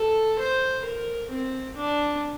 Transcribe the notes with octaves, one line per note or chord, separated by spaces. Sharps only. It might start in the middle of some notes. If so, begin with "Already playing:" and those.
Already playing: A4
C5
A#4
C4
D4